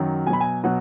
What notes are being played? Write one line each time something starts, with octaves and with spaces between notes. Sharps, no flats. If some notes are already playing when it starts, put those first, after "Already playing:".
Already playing: F#2 D#3 F#3
B2 F#3 G#5 B5
G#5
B2 F#3 F#5